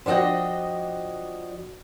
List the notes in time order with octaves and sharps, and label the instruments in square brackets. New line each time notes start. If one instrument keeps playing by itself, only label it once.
[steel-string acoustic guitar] F3 D4 F#4 D#5 G5